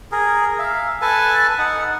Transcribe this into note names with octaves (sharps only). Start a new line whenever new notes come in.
G#4 A#4
E5 F5
A4 B4 G#5 A5
D#4 F#5